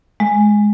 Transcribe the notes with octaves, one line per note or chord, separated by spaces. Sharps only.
G#3